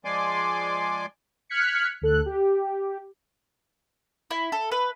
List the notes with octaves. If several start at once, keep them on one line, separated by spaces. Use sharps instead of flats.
F3 G#3 D5 G#5 C6 D6
F6 F#6 G#6 B6 C#7
D2 A4 F#6
G4
E4
A4
B4